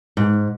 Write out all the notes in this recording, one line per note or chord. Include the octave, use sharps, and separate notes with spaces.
G#2